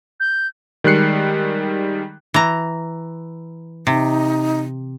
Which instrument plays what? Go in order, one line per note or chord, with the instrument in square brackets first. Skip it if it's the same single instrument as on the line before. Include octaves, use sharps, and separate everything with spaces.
[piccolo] G6
[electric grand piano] D#3 G3 G#3 F#6 C7 C#7
[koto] E3 A#5
[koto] C3 [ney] D#4